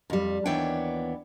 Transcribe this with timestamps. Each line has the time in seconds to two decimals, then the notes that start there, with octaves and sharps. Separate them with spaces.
0.10 F2 G3
0.46 D#2 E3 B3 D4 C#5 G5